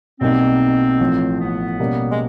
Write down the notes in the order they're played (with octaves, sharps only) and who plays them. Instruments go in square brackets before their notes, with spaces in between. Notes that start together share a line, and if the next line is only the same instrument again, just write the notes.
[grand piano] B1 B2 G3 A#3 D#4 [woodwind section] C4
[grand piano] A1 A2 F3
[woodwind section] B3
[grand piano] B2 G3 A#3 C#4
[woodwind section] G#3